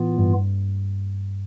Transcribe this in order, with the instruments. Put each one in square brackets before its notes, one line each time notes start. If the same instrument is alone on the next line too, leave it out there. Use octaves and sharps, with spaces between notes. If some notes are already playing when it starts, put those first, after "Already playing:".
Already playing: [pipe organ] A2 E3 B3 F4
[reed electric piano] G2